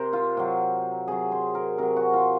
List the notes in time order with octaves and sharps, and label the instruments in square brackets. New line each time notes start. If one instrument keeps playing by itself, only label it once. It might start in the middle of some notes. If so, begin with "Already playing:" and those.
Already playing: [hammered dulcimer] C3 A#4 C5
F4
C3 F#3
C3 F#3 G#4
C5
A#4
C3 F#3 A#4
F#4
F4